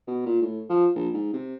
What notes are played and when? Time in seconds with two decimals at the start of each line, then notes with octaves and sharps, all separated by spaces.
0.07 B2
0.26 A#2
0.42 A2
0.69 F3
0.96 A#1
1.14 G#2
1.33 C3